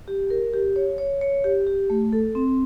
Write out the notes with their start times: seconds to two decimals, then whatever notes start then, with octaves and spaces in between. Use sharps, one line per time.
0.08 G4
0.30 A#4
0.54 G4
0.76 C#5
0.98 C#5
1.21 C#5
1.44 G4
1.67 G4
1.90 A3
2.13 A4
2.35 C4